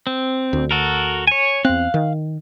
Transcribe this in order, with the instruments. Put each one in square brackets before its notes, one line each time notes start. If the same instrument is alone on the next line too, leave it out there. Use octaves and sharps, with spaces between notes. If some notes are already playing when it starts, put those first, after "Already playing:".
[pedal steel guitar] C4
[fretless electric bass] D2
[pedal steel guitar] F#4 A4 A#4
C#5 G#5
[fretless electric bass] E2 C4 [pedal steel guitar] F5 F#6
[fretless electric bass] D#3